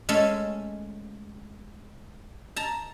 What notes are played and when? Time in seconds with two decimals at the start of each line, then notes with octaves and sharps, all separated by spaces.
0.09 G#3 A3 C#4 A4
2.56 A5 A#5